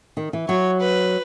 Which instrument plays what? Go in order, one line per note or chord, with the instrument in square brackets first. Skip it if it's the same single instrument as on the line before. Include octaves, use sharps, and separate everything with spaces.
[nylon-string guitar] D#3
E3
[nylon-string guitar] F#3 [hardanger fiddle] C#5
[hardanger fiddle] B4